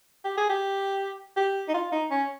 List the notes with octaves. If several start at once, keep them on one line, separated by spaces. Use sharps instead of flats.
G4
G#4
G4
G4
D#4
F4
D#4
C#4